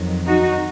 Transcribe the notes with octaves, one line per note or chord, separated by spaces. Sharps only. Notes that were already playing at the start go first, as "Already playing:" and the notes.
Already playing: F2 D#3 F#3
D#4 F#4